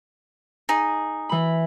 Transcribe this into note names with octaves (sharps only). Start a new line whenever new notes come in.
D#4 G#4
E3 B5